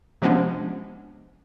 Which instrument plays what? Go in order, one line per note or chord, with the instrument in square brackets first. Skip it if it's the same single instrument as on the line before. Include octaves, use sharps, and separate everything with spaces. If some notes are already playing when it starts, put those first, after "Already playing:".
[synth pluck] C3 F3 G#3 B3 C#4 D4